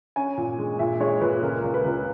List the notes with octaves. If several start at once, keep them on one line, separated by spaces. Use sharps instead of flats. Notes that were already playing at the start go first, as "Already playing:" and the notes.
C#4 G#5
A#2
G#3
A#2 E5
G#3 C#5
A#2 B4
C#2 A#4
C#2
B4
C#2